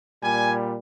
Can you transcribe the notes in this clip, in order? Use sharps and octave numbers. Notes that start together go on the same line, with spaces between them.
A#2 G3 G#5